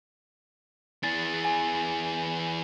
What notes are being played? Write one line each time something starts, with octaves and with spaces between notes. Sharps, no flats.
E3 G#4 A6
G#5